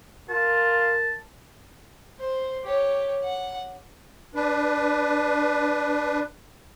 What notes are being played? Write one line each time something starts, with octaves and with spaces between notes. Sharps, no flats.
F4 A#4 A5
C5
G4 C#5
F#5
D4 B4